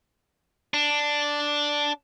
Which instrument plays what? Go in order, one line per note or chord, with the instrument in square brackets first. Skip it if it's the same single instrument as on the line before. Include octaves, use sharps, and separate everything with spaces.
[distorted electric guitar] D4